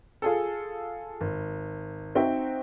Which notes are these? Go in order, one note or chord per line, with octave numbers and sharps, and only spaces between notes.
F4 G#4 A4
G#1
C4 D#4 F#4 E5 G5